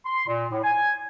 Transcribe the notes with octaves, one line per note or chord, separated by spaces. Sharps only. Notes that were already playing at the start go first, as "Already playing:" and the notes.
C6
A#2
A2
G#5